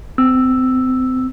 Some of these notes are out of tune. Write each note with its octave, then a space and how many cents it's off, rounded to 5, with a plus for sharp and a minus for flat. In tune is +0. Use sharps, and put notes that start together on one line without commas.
C4 -30 E6 +0